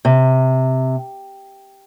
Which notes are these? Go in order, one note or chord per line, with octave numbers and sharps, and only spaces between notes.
C3